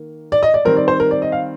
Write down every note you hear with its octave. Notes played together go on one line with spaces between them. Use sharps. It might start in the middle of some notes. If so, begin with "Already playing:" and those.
Already playing: D#3 A#3
D5
D#5
D5
D#3 G3 C4 A#4
D5
C5
A#4
D5
D#5
F5